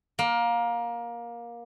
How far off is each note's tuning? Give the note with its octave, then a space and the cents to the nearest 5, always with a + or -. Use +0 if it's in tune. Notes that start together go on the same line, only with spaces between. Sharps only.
A#3 +20